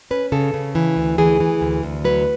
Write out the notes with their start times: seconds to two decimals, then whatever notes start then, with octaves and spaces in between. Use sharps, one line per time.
0.11 C#4 B4
0.32 C#3 A4
0.54 C#3
0.75 E3
0.97 D2
1.18 E3 G#4
1.40 E3
1.61 D2
1.83 D2
2.04 F#3 B4